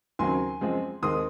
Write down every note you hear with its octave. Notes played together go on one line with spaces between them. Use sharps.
D#2 C#3 F#3 C4 G#5 C6
F#2 F3 G#3 C4
D#2 D#3 G#3 C4 C6 D#6